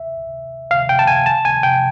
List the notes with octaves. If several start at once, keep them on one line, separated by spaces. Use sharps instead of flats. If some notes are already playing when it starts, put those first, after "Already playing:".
Already playing: E5
F5
G5
A5
G#5
A5
G#5
G5